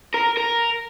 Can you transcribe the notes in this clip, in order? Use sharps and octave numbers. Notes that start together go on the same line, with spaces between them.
A#4
A#4